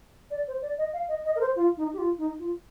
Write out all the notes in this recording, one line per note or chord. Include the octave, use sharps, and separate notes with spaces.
D5
C5
D5
D#5
F5
D#5
D#5
A#4
C5
F4
D#4
G4
F4
D#4
F4